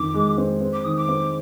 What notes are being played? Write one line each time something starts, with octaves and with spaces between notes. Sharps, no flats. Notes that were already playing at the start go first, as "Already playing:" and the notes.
Already playing: F2 D#3 D6
G#3
C4
C4
D6
D#3 D#6
D6
C4